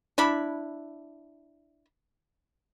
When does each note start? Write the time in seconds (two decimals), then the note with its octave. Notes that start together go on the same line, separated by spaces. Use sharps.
0.18 D4 E4 B5